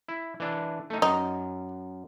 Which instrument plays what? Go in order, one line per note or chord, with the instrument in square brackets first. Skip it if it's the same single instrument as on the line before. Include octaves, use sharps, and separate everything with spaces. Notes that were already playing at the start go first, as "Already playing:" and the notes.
[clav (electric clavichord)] E4
E3 D4
A3 D#4
[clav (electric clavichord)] F#2 [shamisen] D#4